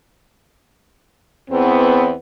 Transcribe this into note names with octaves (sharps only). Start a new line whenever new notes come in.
E2 B3 C4